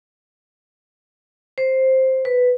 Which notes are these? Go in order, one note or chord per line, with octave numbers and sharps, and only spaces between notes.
C5
B4